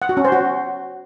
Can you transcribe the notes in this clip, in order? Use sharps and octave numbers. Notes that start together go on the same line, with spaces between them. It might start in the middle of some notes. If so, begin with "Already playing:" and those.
F#5
F#4
C#4
C5
F#4